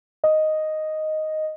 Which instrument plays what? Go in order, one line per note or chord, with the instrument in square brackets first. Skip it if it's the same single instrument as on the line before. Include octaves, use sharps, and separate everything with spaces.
[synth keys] D#5